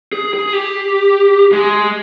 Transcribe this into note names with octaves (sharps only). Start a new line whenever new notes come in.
G#4
G#4
G4
G#3